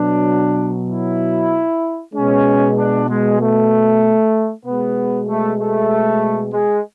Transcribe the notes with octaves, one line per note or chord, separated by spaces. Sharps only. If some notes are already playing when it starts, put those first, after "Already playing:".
Already playing: B2 F#3 D4
E4
B2 G#3 C#4
D4
G#3
A3
B2 G#3 B3
A3
A3
G#3